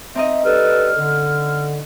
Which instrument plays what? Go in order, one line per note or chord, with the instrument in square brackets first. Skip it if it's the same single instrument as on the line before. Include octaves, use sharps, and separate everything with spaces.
[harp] C4 D#4 D#5 [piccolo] E5
[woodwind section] G3 A4 B4 [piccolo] F6
[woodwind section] D3